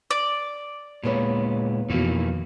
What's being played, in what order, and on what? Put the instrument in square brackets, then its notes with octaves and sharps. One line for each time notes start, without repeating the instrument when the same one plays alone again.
[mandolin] D5
[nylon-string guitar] D#2 B3 C#5 [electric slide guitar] A#2 G#3
[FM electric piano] F2 B2 [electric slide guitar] D#3 E3 A#3